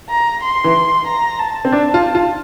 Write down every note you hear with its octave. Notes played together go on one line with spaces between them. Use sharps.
A#5
C6
E3
A#5
A5
C4
D4 A5
F4
F4